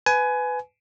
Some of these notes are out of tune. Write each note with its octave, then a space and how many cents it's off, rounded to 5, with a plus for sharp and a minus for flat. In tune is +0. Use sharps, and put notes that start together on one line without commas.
B4 +15 G#5 +20